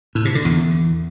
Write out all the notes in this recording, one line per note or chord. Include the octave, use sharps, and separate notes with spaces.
A2
C3
D3
E2